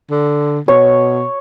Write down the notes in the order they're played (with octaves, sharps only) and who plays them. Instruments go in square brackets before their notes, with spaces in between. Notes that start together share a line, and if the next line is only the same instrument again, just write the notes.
[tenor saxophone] D3
[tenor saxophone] B2 [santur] C#5